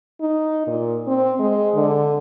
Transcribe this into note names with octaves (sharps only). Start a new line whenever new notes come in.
D#4
A#2
C4
G#3
D3